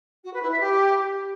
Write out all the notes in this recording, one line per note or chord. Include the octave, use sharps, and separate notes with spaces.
F#4
B4
E4
E5
G4